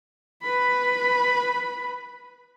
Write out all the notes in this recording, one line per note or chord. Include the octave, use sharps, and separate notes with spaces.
B4 B5